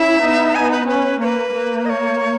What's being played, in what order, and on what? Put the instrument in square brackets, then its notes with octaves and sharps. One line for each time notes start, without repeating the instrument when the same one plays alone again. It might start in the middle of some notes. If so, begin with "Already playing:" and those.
Already playing: [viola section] C#4 E4 [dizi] E5
[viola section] B3 D#4
[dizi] G#5
B4
[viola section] C#4 [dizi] B4
[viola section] A#3 [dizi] B4 C#5
[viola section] A#3
[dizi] D#5
C#5